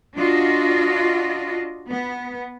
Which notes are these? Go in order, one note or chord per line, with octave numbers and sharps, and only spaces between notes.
D4 F4 F#4 D#5
B3